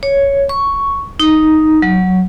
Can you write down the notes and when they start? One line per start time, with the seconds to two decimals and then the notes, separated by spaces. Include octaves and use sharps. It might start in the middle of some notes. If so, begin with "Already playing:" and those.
0.03 C#5
0.49 C#6
1.20 D#4
1.82 F#3